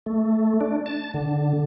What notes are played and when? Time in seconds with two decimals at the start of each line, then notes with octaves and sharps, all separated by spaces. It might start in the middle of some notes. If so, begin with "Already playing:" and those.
0.06 A3
0.61 D4
0.86 A5
1.14 D3